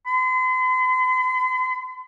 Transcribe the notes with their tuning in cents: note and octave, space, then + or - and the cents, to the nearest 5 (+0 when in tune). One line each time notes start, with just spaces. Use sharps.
C6 -45